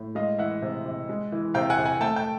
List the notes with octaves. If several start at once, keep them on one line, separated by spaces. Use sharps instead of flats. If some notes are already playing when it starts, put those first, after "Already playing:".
Already playing: A2
G#3 D#5 F5
E3 E5 F#5
C3
C3
G#3
E3
C3 F5 G5
F#5 G#5
C3
F#5 G#5
A3 G5 A5
G5 A5